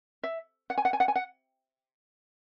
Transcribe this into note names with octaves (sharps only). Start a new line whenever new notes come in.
E5
F#5
G#5
F#5
G#5
F#5
G#5
F#5